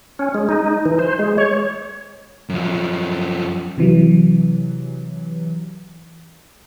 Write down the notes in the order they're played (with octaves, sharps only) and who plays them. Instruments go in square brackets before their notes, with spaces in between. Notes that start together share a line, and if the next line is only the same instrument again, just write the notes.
[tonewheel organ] C#4
G#3
D#4
E3
C5
G#3
C#5
[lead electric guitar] F#2 F3
[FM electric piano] C3 E3 F#3